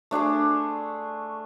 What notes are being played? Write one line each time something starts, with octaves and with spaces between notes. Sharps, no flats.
A3 D4 G#4 C6